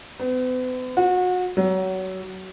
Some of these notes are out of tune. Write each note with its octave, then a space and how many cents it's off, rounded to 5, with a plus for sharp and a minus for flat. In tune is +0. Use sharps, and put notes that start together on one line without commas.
B3 +45
F#4 -30
F#3 +25